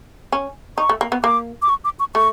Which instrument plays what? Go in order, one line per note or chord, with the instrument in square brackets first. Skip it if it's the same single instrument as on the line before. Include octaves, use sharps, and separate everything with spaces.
[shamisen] C#4
[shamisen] D#4 [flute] C#6
[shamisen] A3
A#3
B3
[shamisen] A#3 [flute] D6
[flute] D6
C#6
D6
C#6
[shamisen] A3 [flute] C#6